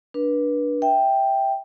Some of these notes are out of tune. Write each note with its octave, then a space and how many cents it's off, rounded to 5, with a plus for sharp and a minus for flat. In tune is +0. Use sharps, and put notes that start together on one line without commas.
D4 +0 B4 -30
E5 -10 G5 +0